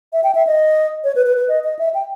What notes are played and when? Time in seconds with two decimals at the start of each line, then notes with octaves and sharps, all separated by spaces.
0.13 E5
0.23 G5
0.35 E5
0.47 D#5
1.04 C#5
1.15 B4
1.26 B4
1.37 B4
1.49 D#5
1.64 D#5
1.79 E5
1.94 G5